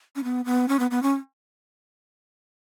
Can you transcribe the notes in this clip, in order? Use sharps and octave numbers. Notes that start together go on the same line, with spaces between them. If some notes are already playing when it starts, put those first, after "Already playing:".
C#4
B3
B3
C#4
B3
B3
C#4